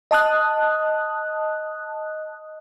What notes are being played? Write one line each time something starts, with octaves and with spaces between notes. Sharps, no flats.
D#5 A5 D#6 F#6